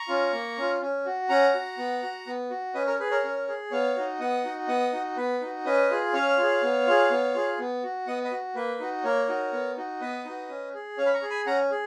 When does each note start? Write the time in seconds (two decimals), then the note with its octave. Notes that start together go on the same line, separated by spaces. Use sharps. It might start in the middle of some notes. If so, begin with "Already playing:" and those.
Already playing: A#5 C#6
0.08 C#4 F4
0.33 A#3
0.58 C#4 F4
0.82 C#4
1.06 F#4
1.29 C#4 F#5 A#5
1.54 F#4
1.78 B3
2.03 F#4
2.27 B3
2.50 F#4
2.74 C#4 B4 D#5
2.87 A#4 C#5
3.00 G#4 B4
3.11 A#4 C#5
3.24 C#4
3.48 G#4
3.71 B3 C#5 F5
3.96 D#4 F#4
4.20 B3 D#5 F#5
4.44 D#4 F#4
4.68 B3 D#5 F#5
4.93 D#4 F#4
5.17 B3 B4
5.41 D#4 F#4
5.65 C#4 B4 D#5
5.90 F4 G#4
6.13 C#4 C#5 F5
6.38 F4 G#4
6.63 B3
6.87 F4 G#4
7.10 B3
7.34 F4 G#4
7.59 B3
7.83 F#4
8.07 B3 D#5 F#5
8.24 B4 D#5
8.31 F#4
8.55 A#3 B4
8.79 D#4 F#4
9.04 A#3 A#4 C#5
9.28 D#4 F#4
9.53 B3
9.77 D#4 F#4
10.01 B3 B4 D#5
10.25 D#4 F#4
10.49 C#4
10.74 G#4
10.98 C#4 C#5 F5
11.06 B5
11.14 A#5 C#6
11.22 G#4
11.30 G#5 B5
11.46 C#4 F#5 A#5
11.71 G#4